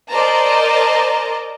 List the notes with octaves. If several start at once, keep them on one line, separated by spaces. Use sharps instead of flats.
A#4 C5 D5 D#5 A5 A#5